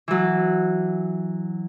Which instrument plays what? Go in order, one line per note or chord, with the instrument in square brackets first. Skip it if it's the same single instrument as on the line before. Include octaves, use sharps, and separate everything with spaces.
[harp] E3 F#3